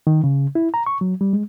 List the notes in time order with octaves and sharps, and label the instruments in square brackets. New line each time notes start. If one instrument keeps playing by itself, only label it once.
[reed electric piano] D#3
C#3
E4
A#5
C#6
F#3
G3
G#3